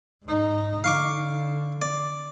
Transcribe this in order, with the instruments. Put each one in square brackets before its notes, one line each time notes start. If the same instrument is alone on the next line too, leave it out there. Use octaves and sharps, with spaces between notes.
[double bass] G#2 D#4
[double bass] D3 [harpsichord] F5 C#6 D6
[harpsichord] D5